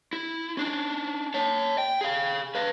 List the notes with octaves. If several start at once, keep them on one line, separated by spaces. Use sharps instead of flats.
E4
C#4 D4
C#5 A5
G5
G#4 F5
B4 F5